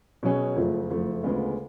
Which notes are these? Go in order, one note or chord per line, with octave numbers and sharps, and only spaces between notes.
B2 F#3 C#4 G#4
F#1 F2 F3 A3
F#1 F2 F3 A3
D2 C#3 G#3 B3 F4